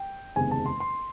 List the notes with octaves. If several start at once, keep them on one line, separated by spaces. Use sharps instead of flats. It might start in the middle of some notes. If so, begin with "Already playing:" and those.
Already playing: G5
F#1 E2 C3 D#3 G#3 G#5
A5
C6
C6